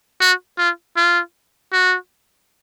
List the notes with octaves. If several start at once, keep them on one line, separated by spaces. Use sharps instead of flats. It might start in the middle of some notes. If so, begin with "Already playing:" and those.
F#4
F4
F4
F#4